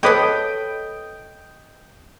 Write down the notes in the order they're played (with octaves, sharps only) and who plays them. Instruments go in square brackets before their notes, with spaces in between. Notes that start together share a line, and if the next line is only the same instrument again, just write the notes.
[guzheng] A4 C#5 [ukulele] B4 D#5 [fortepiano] G5 D#6